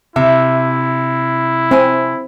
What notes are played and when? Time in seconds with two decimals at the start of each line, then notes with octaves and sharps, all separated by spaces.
0.16 C3 E4 E5
1.71 C3 C4 G#5